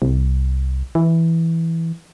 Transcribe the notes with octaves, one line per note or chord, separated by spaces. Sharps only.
C2
E3